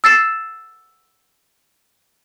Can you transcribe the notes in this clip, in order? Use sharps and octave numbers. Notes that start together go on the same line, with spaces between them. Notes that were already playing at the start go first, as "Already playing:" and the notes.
E6 A6 C7 E7